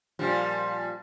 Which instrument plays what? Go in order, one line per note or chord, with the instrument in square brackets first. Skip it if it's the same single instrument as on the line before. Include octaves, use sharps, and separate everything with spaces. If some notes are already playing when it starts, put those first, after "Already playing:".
[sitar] A#2 F3 G3